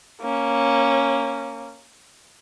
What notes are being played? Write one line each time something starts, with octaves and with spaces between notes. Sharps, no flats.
A#3 C#4